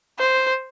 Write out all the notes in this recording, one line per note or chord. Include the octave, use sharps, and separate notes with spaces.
C5